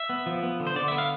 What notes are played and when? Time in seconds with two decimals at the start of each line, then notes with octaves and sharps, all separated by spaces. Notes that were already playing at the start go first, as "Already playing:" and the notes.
Already playing: E5
0.09 B3
0.26 F3
0.43 B3
0.60 D3
0.67 C5
0.76 D3 D5
0.88 B3 E5
0.98 F5